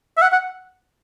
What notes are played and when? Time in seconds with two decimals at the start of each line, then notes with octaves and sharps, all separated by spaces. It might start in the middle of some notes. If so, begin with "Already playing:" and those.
0.17 E5
0.22 F#5
0.32 F#5